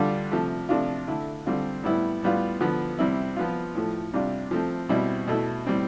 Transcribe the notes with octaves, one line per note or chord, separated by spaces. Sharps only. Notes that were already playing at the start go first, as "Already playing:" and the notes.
Already playing: D3 G3 D4 F4
C3 F3 A3
C3 F3 A3 D4 F4
D3 A3 E4
D3 G3 C4 F4
A2 G3 B3 E4
A2 G3 B3 F4
D3 F3 B3
C3 G3 C4 E4
F3 B3 F4
A2 F3 A3
C3 G3 D4 F4
F3 A3 C4
B2 G3 C4 E4
B2 A3 E4
A2 G3 C4